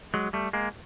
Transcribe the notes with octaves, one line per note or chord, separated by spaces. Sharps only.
F#3 G#3
G3 A3
G#3 A#3